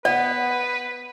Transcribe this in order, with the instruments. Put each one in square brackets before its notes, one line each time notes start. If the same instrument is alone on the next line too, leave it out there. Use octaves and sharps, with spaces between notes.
[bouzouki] B3 [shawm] B4 [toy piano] D5